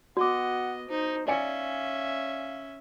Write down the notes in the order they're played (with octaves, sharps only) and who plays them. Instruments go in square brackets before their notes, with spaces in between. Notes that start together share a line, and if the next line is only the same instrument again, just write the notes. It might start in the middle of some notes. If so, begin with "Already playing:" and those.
[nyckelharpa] B3 D#5 [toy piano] F#4 D6 [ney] F#5
[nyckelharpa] D#4 [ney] C5
[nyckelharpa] C#4 E5 [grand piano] D5 G#5 C#7 [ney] F5